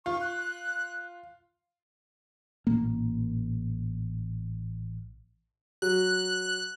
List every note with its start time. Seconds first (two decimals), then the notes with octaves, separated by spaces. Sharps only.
0.06 F4 C#6
0.21 F#6
2.67 A1 A#2 A#3
5.82 F#3 F#6